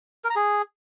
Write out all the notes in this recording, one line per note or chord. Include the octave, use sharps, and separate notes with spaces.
A#4
A#5
G#4